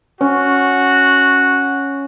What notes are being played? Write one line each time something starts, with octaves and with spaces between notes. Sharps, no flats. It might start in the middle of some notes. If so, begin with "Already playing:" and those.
C#4 F#4